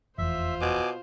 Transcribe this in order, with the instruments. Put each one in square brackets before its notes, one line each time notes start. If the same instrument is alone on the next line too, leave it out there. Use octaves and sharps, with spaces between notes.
[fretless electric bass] F1 E2 [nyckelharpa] F4 C5 [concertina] E5
[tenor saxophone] B2 [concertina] G#5 D6